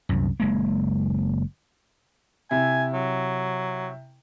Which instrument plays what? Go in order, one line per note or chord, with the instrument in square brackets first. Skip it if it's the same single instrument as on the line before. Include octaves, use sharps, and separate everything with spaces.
[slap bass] C2 F#2
F#1 G#3 A#3
[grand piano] C3 E4 [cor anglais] G#5
[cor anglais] F#3